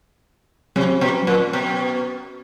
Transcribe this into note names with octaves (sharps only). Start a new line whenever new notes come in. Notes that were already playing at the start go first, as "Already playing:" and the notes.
C3 F#3
B2
A#2
B2